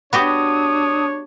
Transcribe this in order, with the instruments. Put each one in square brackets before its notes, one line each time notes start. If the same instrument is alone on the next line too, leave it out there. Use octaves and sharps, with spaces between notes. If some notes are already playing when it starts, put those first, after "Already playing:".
[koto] B3 F#4 G4 [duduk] D4 [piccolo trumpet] C#5 [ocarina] D#6